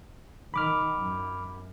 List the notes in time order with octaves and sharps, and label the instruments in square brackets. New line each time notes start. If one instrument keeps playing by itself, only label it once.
[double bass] D#3 [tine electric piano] B5 D6 F6
[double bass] F#2